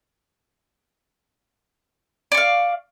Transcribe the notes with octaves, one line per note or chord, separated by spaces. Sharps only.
D5 F5 C#6